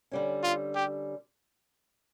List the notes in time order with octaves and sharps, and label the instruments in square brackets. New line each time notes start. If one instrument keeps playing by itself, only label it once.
[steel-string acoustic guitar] D3 G3 C#4
[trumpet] F4
G4